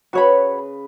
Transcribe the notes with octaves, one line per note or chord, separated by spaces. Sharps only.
C#3 F#4 B4 C#5 B5